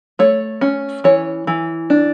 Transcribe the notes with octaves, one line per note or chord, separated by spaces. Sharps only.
A3 C#5
C#4
E3 C#5
E3
D4